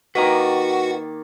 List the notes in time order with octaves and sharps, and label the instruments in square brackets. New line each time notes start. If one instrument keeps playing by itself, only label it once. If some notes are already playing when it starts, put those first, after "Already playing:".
[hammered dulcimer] D#3 A#3 D5 [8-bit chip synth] F#4 [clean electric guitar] B4 D#5 A#5